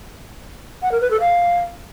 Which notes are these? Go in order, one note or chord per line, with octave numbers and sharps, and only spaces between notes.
F#5
A#4
B4
A4
F5